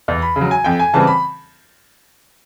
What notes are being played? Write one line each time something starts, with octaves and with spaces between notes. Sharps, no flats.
E2
B5
C#3
F#3
G#5
F2 G5
G#5
C#3 E3 G3 C4 A5
B5